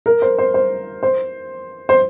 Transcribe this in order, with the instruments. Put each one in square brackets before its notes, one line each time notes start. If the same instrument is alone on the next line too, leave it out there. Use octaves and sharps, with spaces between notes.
[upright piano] A#4
C5
C5
C5
C5
C5